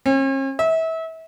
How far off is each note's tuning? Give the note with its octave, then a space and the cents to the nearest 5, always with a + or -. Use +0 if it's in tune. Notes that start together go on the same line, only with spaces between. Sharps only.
C#4 -45
E5 -30